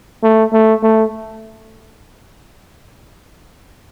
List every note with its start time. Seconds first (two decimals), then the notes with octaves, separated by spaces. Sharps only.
0.23 A3
0.53 A3
0.83 A3